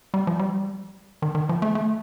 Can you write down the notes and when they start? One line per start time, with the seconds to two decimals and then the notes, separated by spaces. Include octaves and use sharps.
0.14 G3
0.27 F3
0.39 G3
1.22 D#3
1.35 D#3
1.49 F3
1.62 A3
1.75 A3